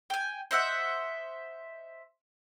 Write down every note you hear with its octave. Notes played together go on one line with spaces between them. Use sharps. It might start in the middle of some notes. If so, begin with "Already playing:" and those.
G5 G#5
C5 D#5 E5 F#5